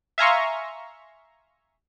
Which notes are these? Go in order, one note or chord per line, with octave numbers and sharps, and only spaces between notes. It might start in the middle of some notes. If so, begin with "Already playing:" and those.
E5 F5 G#5 A#5 C6 C#6